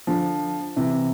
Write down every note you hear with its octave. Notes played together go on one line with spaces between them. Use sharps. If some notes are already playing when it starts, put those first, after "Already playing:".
D3 F3
C3 E3